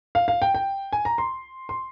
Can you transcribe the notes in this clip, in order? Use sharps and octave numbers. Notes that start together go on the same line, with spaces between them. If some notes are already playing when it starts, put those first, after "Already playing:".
F5
F5
G5
G5
G#5
A#5
C6
C6